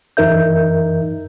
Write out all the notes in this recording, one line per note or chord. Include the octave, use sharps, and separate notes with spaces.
F#2 E3 D#4 A#4 E5 G6